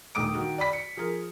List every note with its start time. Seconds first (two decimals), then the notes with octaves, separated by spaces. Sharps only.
0.15 D#1 D#3 A3 D6 D#6 D7
0.34 D#3 F#4
0.58 D5 B5 B6
0.73 C#7
0.97 F3 G#4 A#4